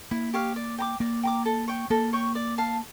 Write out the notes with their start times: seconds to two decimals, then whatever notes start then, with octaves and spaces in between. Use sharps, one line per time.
0.11 A#3 E4
0.34 G4 C#5 F5
0.56 D5
0.78 G5 A#5 D6
1.00 A#3 D5
1.23 G5 A#5 D6
1.45 A4
1.68 C#5 G5 C#6
1.90 A#3 A4
2.13 C#5 G5 C#6
2.35 D5
2.58 F5 A5